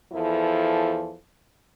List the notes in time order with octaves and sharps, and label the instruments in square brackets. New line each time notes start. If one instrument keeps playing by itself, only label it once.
[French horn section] E2 F3 E4 A4